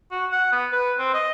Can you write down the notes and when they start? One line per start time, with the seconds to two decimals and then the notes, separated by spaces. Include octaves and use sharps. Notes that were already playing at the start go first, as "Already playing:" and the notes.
0.11 F#4
0.32 F#5
0.52 B3
0.73 B4
0.99 C4
1.14 D#5